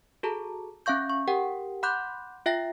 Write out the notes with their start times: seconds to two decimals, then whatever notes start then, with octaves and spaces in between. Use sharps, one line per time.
0.23 F#4 G#4 A4 A5 A#5
0.86 C#4 E5 F5 C#6 G6
1.10 C#6
1.28 G4 A#4 F#5 G5
1.83 F#5 B5 C6 D6 F#6 G6
2.46 F4 E5 G5 A#6